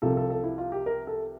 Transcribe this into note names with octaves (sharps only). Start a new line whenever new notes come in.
C2 C3 F3 A4
A4
A4
E4
F4
G4
A#4
A4